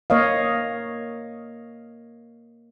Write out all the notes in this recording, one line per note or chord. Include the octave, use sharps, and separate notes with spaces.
A#3 C#5 D#5 F5